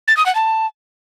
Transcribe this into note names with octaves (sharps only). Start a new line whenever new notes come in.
A6
D#6
F#5
A5